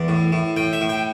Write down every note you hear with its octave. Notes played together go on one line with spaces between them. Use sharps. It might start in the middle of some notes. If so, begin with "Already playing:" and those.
Already playing: E2 D5
A2
A2
A2 G5
E5
A2
G5